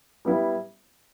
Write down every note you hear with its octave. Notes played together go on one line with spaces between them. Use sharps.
G3 B3 E4